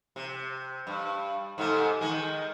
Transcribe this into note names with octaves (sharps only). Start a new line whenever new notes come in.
C3
G2
G#2 C3 A3
D#3 G#3